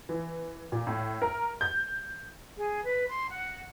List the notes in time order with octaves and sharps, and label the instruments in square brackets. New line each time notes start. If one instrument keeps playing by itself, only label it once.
[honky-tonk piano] E3
A#2
A2
A#4
G6
[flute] G#4
B4
C6
F#5